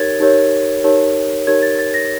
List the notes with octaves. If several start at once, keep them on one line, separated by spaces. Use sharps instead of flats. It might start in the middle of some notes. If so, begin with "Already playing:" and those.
Already playing: D#4 G4 A#4 C#5 G#6 A6
D#4 G4 A#4 C#5
D#4 G4 A#4 C#5
D#4 G4 A#4 C#5 G#6
A6
A6
A#6